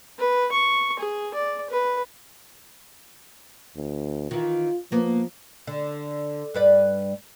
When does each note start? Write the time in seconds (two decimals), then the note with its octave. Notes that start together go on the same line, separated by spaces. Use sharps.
0.19 B4
0.52 C#6
0.99 G#4
1.34 D5
1.70 B4
3.76 D2
4.31 D#3 E3 F4
4.92 F3 A#3 B3
5.67 D3
6.54 G2 B4 D5